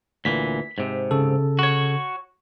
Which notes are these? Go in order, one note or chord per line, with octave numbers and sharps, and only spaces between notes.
D2 A#2 E3 B6
G#2 C3
C#3 A4
F#4 C#5